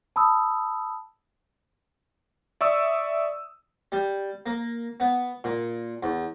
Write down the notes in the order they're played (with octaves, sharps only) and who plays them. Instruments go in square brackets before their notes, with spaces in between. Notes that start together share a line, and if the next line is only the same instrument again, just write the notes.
[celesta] A5 B5 D#6 E6
[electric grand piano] D5 E5 C#6 D#6 E6
[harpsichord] G3
A#3
B3
A#2
E2